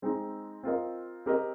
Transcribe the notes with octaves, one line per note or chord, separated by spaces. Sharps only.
G#3 C4 D#4
C4 F4 A#4 D#5
C4 G4 A#4 D#5